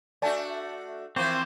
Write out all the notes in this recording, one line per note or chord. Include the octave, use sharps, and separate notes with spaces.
A3 D4 F#4 D5 G#5 A5
E3 F3 A#3 C4 C5 C#6 D6 G6